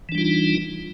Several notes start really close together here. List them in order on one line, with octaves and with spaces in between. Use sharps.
E3 D4 G3 F4 D#4